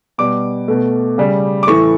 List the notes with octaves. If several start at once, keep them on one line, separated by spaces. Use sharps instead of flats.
B2 G3 D6
B2 A3
C#3 G3
D6
A2 E3 A3 C#6